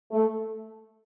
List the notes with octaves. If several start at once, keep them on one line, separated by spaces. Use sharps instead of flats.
A3